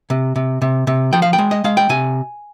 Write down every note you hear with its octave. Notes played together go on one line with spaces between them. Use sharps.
C3
C3
C3
C3
F3 G5
F5
G5
G#3
D#5
G#3 F5
G5
C3 G#5